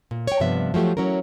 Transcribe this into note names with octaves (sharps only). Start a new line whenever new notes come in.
A#2
C#5 G5
G2 C3 F3 B3 E5
F3 F#3 A3 G4
F#3 C#4 E4 A#4